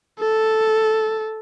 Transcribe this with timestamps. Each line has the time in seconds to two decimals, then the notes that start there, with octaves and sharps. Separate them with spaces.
0.20 A4